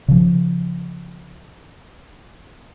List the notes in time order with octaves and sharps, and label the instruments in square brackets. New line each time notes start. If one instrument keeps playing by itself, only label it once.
[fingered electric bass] C#3 F3